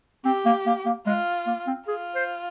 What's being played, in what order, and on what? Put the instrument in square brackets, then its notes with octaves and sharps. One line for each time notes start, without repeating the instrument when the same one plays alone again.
[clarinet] C4 [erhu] G4
[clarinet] A#3
A#3
A#3
[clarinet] G#3 [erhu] F4
[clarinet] A#3
C4
[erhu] F4 [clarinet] G#4
[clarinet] C5